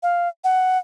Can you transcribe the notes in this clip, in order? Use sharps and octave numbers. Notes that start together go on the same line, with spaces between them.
F5
F#5